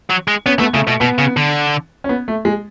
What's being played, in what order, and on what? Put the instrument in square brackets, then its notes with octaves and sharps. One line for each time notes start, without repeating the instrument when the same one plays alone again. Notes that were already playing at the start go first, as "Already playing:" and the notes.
[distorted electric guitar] F#3
G#3
[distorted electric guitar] B3 [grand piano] C#4
[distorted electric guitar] A3 [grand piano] B3
[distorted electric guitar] C#3 [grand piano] A3
[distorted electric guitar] B2 [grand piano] A3
[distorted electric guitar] B2 [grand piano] B3
[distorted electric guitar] C#3
D3
[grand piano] C#4
B3
A3
G#3